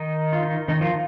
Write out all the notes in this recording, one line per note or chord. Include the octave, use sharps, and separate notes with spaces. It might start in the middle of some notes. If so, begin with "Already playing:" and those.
Already playing: D#3 D#4
F4
D#3 D#4
D#3 D#4
F3 F4